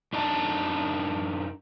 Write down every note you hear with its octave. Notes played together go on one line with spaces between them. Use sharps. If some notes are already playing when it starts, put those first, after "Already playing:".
F#2 D4 D#4 A5